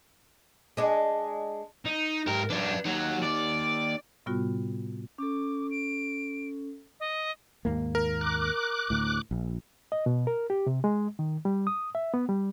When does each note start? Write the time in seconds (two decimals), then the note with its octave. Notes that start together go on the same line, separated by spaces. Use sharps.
0.77 G#3 D4
1.86 D#4
2.27 G#2 G4 A#4
2.50 F#2 D4 B4 D5
2.85 F#3 A#3 D#4
3.23 D5
4.26 A2 C3 G3 B3 F4 F#4
5.18 C#4 A4 D6
5.71 D7
7.00 D#5
7.65 D#2 G#2 A#3
7.95 A#4
8.21 D6 F#6
8.90 D2 A2
9.31 A#1
9.92 D#5
10.06 B2
10.27 A#4
10.50 G4
10.67 C3
10.84 G#3
11.19 D#3
11.45 G3
11.67 D#6
11.95 E5
12.14 B3
12.29 G3